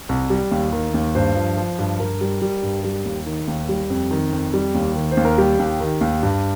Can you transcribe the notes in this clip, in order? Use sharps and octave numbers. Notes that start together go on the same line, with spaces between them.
C2
G3
D#2
D#3
D#2
G2 C5
F3
F3
G2
G2 A#4
G3
G3
G2
G3
D#2
D#3
D#2
G3
F2
D#3
F2
G3
D#2
D#3
C5
D#2
A#4
G3 G4
D#2
D#3
D#2
G2